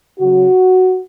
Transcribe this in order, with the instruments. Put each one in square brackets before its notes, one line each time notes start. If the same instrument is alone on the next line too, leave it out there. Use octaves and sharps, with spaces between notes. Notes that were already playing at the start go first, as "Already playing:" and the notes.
[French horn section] C#3 F#3 F#4